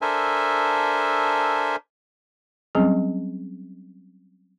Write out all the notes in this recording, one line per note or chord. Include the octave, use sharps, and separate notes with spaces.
D4 A4 A#4 C5 E5 G#5
F#3 G3 C4 C#4 G#4